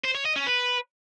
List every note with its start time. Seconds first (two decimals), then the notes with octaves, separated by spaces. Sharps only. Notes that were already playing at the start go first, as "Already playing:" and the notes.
0.05 C5
0.15 C#5
0.26 D#5
0.36 C#4
0.47 B4